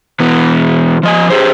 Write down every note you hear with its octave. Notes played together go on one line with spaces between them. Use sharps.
B2 E3 B3
F3 D#5 G#5
G4 G#4 C5